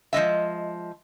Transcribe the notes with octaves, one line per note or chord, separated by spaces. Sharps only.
F3 G#3 D#5 E5